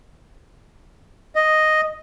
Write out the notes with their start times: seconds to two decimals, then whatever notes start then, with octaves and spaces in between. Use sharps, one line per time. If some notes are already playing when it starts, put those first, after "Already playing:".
1.35 D#5